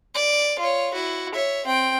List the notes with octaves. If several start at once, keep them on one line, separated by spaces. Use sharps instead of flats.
D5
F4 C#5
E4 F#4
C#5 E5
C4 G5